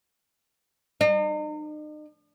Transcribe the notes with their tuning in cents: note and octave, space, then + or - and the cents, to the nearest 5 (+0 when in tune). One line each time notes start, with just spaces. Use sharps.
D#4 -40